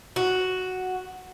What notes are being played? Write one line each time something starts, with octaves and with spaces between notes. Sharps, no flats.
F#4